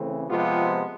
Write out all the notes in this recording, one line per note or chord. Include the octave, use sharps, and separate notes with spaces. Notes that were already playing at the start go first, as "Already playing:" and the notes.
Already playing: C#3 E3 A3 C4
C3 F3 G#3 B3 F4 G4